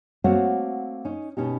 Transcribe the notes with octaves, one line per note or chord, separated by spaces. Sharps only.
A3 A#3 C4 F#4 C#5 F#5
C#4 D#4
B2 C#4 D#4 G4